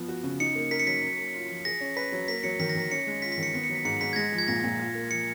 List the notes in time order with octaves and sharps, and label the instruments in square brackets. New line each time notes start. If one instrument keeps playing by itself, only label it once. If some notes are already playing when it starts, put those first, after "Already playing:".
Already playing: [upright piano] F3 B3
F#4
C#3
[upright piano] D#4 [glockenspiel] C#7
[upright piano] A#3
[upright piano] A#4 [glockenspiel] B6
[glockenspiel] C#7
[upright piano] F#3 [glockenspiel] B6
[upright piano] C#4
A#3
F4
F3
[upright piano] G#4 [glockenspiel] A#6
[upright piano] C#4
[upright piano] B4 [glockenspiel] B6
[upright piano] F#3
[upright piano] A#3 [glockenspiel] B6
[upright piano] F#3 [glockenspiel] C#7
[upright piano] D#3 [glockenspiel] B6
[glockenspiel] A#6
[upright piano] D#3 [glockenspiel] B6
[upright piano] C#4 [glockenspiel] C#7
[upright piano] G#3
[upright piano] F4 [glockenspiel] B6
[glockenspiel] B6
[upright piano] D#3
[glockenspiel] C#7
[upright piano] B3 [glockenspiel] B6
[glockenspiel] C#7
[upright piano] F#3
[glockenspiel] B6
[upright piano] G#2 [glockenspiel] C#7
[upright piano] G#2 [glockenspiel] B6
[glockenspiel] G#6
[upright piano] G#3 [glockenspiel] A#6
[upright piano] F3
[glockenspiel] G#6
[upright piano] A#2 [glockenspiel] A#6
[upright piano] A#2
F4
A#3
[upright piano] F3 [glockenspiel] C#7